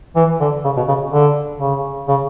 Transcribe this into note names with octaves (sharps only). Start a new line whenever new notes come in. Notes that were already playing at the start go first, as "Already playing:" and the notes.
E3
D3
C#3
B2
C#3
D3
C#3
C#3